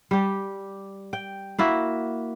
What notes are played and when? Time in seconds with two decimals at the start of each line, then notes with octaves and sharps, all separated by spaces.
0.11 G3 G4
1.13 G5
1.58 A#3 E4 F#4